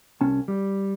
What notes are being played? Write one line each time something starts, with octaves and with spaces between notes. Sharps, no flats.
C2 C#4 A5
G3